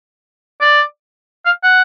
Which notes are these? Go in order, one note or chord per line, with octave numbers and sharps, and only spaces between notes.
D5
F5
F#5